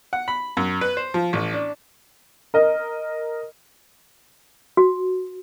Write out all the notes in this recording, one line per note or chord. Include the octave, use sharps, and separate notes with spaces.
F#5
B5
F#2
B4
C5
F3
A1
D4
A#4 D#5
F#4